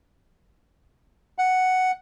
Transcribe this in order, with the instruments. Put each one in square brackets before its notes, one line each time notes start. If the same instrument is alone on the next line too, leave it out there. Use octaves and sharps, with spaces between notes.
[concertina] F#5